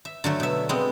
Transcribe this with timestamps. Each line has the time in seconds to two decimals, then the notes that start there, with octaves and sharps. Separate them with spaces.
0.05 E5
0.24 D3 F#3 A3
0.40 B2 E5
0.69 G#3 B3 C4